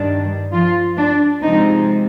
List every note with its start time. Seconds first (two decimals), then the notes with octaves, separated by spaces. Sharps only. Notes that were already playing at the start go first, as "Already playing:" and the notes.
Already playing: G2 D#3 G3 D4
0.53 F3 F4
0.97 D4
1.41 C3 F3 G#3 C4 D#4